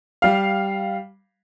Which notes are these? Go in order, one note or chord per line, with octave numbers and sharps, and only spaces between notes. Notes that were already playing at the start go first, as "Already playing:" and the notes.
G3 F5